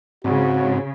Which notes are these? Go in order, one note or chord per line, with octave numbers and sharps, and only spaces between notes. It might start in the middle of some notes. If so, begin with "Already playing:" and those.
G#2 C#3 C4 F#4